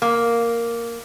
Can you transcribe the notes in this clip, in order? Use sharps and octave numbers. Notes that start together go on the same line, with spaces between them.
A#3